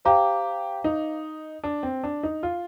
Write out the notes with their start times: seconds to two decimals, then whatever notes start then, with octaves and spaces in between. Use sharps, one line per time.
0.05 G4 C5 F5 A#5 D6
0.84 D#4
1.64 D4
1.83 C4
2.03 D4
2.23 D#4
2.43 F4